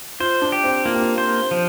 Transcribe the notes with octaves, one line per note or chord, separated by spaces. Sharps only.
F4 C5
D4
G4
C4
A#3 F4
G4
F4
C5
F3